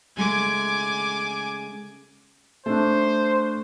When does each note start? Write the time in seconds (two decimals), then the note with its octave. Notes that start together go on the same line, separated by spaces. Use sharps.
0.17 C#3 G#3 A3 G#5 D6
2.66 A3 D4 C5